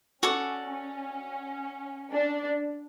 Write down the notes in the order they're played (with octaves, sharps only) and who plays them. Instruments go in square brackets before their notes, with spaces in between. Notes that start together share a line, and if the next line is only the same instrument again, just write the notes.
[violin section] C#4 [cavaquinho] F#4 A4 D5
[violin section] C#4
D4